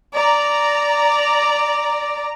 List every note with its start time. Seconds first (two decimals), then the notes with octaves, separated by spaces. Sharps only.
0.15 D5 A#5